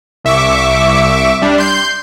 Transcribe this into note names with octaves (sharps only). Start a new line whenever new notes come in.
C2 E5 C#6 D6
G3 D4
C6 G6